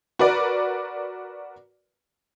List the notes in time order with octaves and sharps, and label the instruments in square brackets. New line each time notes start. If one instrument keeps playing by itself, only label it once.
[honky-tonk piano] F#4 A#4 B4 D5